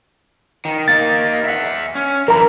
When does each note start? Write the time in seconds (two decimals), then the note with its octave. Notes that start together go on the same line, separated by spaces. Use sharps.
0.65 D#3
0.88 A#3 D#4 A6
1.45 E5 F#5
1.95 C#4
2.28 F#2 E3 A#4 A#5